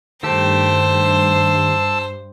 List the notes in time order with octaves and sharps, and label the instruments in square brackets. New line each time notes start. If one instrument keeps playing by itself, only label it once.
[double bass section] G2 [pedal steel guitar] D#3 A3 G4 [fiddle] C5 [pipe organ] A5 E6